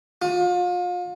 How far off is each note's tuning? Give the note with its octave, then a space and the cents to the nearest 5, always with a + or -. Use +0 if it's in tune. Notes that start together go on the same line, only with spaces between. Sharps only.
F4 +35